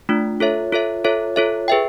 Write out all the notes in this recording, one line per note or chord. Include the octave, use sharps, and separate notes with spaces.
A3 D4 F4
F4 A4 C#5 E5
F4 A4 C#5 E5
F4 A4 C#5 E5
F4 A4 C#5 E5
G#4 B4 E5 G5